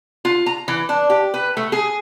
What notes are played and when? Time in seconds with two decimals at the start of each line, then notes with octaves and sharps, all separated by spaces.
0.25 F4
0.46 A#5
0.68 E3
0.89 D4
1.10 G4
1.34 B4
1.57 A3
1.72 G#4